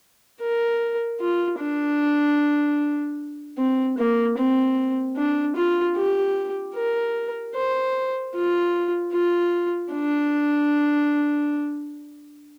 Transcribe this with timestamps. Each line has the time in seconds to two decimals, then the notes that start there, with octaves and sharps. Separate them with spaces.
0.41 A#4
1.20 F4
1.59 D4
3.58 C4
3.98 A#3
4.38 C4
5.17 D4
5.56 F4
5.96 G4
6.75 A#4
7.55 C5
8.34 F4
9.13 F4
9.92 D4